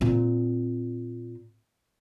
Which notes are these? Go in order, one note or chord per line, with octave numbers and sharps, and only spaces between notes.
A#2 C4